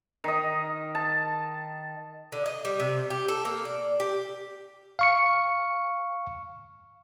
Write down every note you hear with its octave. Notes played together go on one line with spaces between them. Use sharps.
D#3 D#5
A5
D3
D#5
G3
C3
G4
A4
A#3
D5
G4
F5 C#6 C#7